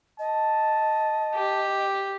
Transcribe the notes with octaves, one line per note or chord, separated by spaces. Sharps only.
D#5 A5
G4